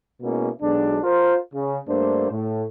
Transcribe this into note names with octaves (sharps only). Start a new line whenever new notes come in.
B2 G#3 A#3 C#4 E4
B1 B2 G#3 D4
F4 A#4 C5
C#3
G2 A3 A#3 D4 C5
A2